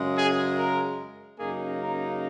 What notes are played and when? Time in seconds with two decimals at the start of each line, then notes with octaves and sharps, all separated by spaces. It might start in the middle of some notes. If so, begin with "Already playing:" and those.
Already playing: F#2 C#3 G#3
0.16 G#4
0.57 A#4
1.39 F#2 C#3 A#3 D#4 G#4
1.81 A#4